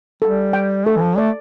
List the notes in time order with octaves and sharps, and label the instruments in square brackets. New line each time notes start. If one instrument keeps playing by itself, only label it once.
[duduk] G3 [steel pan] A4
[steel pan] G5
[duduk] A3 [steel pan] A4
[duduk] E3
F3
[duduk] A3 [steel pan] D5